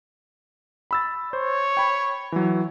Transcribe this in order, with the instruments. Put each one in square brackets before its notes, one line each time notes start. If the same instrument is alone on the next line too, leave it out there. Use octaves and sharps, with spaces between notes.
[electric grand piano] B5 E6 A6
[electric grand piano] C5 [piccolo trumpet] C#5
[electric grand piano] G5 B5
E3 F#3